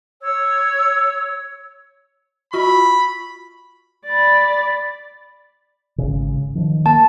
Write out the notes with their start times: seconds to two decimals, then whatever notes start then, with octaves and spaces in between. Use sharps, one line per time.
0.21 C#5 E6
2.53 F4 F#4 B5 C#6
4.06 D5 B5
5.98 G#1 C#3
6.55 D#3 F3
6.86 A#3 A5